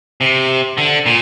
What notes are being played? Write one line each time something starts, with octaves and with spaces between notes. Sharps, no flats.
C3
D3
A#2